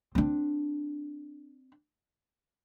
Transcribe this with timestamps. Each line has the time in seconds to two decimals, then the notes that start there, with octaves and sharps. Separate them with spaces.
0.15 C4 D4